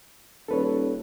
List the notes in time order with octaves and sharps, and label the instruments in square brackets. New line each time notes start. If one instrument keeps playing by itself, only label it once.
[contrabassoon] D#1 [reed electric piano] A4 B4 C#5